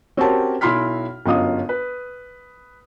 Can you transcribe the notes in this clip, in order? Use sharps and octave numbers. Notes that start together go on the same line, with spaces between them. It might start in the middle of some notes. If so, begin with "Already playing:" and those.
C4 C#4 F#4 G4 A#4 A5
B1 E4 B5 C6 F6 B6
G1 F#2 F4 D#5 F5 D#6
B4